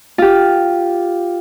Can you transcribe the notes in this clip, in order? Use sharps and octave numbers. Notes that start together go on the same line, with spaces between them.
F4 G4